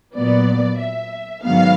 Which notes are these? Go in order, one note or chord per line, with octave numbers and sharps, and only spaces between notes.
A#2 F#3 B3 D5
E5
G#2 D#3 F#3 B3 F5